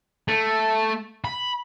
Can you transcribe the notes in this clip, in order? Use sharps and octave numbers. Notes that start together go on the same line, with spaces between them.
A3
B5